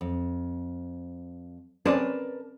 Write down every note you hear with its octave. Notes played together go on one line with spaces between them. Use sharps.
F2
C4 C#4 A#4 B4 D5 A5